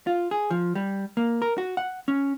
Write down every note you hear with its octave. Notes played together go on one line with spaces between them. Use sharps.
F4
G#4
F3
G3
A#3
A#4
F#4
F#5
C#4